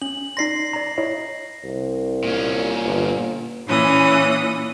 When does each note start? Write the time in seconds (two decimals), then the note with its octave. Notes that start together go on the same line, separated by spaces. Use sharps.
0.02 C#4 F#7
0.37 D#4 D5 C6 A#6 C7
0.73 D5 A#5
0.98 E4 C#5 D#5
1.64 C2
2.24 A#2 C#4
2.84 G1
3.67 A#2 E3 C#4 D#6